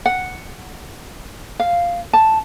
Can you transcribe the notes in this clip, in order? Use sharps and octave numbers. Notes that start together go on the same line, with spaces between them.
F#5
F5
A5